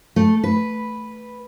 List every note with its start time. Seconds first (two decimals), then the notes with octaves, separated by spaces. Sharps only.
0.16 A3
0.44 B4